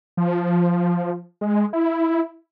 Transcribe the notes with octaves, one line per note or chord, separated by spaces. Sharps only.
F3
G#3
E4